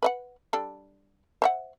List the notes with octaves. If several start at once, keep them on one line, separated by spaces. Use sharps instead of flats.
B4 D#5 F#5
G3 D4 A4
C5 E5 F#5